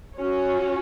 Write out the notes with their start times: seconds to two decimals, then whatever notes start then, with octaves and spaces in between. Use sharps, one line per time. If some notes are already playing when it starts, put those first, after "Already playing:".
0.17 C#4 F#4 C#5